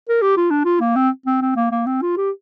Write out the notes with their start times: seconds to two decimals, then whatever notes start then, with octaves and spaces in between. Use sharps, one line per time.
0.09 A#4
0.22 G4
0.37 F4
0.50 D4
0.65 F4
0.80 A#3
0.96 C4
1.26 C4
1.42 C4
1.56 A#3
1.71 A#3
1.86 C4
2.02 F4
2.17 G4